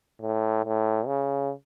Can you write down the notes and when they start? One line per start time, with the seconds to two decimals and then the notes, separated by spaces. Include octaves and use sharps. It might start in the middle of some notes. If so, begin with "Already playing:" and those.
0.21 A2
0.65 A2
1.07 C#3